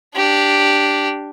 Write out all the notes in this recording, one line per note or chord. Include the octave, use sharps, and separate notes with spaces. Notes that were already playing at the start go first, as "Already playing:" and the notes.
D4 G4